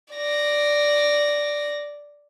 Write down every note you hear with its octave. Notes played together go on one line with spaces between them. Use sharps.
D5 A#6